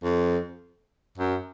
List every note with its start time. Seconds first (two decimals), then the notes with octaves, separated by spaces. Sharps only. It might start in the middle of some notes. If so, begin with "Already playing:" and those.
0.03 F2
1.18 F#2